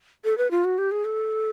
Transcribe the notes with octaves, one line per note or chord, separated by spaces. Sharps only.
A4
B4
F4
F#4
G4
G#4
A4